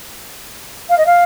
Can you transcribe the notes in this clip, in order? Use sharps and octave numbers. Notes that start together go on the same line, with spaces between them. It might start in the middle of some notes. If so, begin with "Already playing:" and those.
F5
D#5
F5